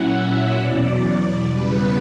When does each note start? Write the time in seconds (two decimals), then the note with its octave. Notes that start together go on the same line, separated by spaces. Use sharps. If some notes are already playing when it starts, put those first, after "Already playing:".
Already playing: A#2 F#3 C#4 E4 F#5
0.12 E5
0.56 E2 B2 F#3 D5
1.45 E2 C#3 G3 B3 B4